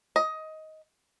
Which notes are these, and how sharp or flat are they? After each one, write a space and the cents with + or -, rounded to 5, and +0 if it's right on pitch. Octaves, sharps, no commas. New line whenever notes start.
D#5 +15